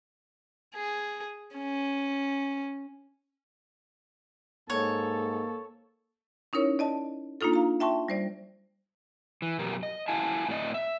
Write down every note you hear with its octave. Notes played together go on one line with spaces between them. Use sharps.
G#4
C#4
G#2 A#3 A4 C#5
C#4 D#4 E4 A#4 C#5
D5 D#5 A5
A#3 D4 D#4 F4 A4
F5 A#5
E5 G5 A5 C6 C#6
G3 C5 D5
E3
F#2 B2 G4 A#4
D#5
E4 F5 G#5 A5
A2 C4 D5 D#5
E5